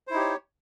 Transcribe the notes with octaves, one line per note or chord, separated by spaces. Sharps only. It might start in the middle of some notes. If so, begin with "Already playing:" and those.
D#4 E4 G4 C5 C#5